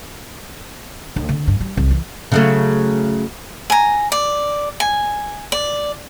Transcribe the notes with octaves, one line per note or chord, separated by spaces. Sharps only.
D2
D3
G2
G3
C2
E3
C#3 F#3 A3
G#5 A#5
D5
G#5
D5